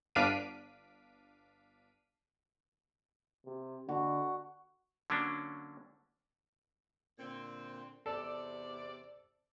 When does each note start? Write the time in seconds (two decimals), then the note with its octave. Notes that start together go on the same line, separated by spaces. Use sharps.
0.15 G1 D4 F5 B6 D7 D#7
3.46 C3
3.89 D3 F#4
5.10 D3 F#3 A#3 C#4 D4
7.19 A#2 D3 C4
8.06 E2 C3 A4 D5